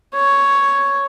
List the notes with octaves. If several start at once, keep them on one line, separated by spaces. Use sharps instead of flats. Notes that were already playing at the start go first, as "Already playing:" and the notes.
C#5